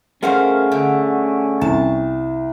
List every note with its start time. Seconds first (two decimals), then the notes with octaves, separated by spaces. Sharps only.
0.23 A3 C#4 G#4 A#4 C5 F5 F#5
0.72 D3
1.61 C2 A5